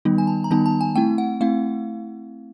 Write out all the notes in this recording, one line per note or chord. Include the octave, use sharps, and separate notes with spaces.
D#3 G3 B3 D#4
G#5
A5
A#5
D#3 G3 B3 D#4 A5
A5
G#5
A3 C4 E4 G5
F#5
A3 C4 E4 F5